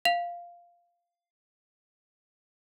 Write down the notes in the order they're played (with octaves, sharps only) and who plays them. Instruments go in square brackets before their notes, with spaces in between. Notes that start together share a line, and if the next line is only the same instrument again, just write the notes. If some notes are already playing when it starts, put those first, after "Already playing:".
[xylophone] F5 F7